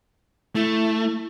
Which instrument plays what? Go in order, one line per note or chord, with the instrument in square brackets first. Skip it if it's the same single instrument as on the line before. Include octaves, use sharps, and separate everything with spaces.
[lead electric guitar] A3 [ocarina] E4